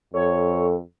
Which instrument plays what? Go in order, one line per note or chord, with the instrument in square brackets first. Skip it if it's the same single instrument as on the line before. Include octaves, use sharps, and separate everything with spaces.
[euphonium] F2 [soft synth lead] A4 [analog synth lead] C#5